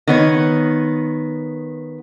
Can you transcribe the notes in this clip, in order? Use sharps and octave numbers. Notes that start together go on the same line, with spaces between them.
D#3 B3 C#5